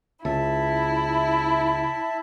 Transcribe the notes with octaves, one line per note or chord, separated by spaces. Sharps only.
C#2 E4 E5 A5